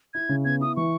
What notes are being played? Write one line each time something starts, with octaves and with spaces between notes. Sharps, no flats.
E4 G#6
C#3
B3 G#6
E4 D#6
E3 C#6